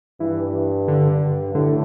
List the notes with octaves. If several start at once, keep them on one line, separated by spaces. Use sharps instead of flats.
G2 E3
D3
G2
A2 D3